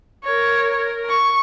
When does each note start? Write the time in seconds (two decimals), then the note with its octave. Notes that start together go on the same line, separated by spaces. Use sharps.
0.24 A#4 C#5
0.75 A#4
1.10 C#6